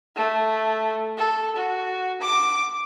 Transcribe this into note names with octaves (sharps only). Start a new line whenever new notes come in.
A3
A4
F#4
D6